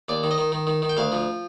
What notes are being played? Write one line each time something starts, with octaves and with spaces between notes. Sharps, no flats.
D#2 D5
D#3
D#5
D#3
D#3
D#3
D#3
G5
D2 F5
F3